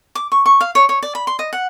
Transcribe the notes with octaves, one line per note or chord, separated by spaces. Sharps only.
D6
C#6
C#6
F5
C#5
C#5
D5
B5
C6
D#5
F#5